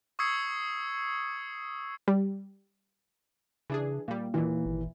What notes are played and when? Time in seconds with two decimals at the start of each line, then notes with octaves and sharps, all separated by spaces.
0.19 C#6 D#6 E6 G#6 C7 C#7
2.08 G3
3.70 C#3 E3 D4 G#4
4.08 A#2 G3 A#3
4.34 D#2 A#2 E3
4.66 G#1